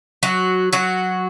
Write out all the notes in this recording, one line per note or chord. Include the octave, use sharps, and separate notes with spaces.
F#3 F#4
F#3 F#4